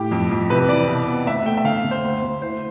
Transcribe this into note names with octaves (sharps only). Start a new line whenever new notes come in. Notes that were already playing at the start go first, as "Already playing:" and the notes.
Already playing: A2 G4
F2
F2
C3 B4
E3 D5
B2
B3
D2 E5
A3 G5
E5
D3 F5
D3
C5
D2
D2
E4 C5